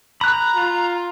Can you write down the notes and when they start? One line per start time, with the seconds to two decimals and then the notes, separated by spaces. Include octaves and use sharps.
0.21 A#5 B5 F#6
0.56 F4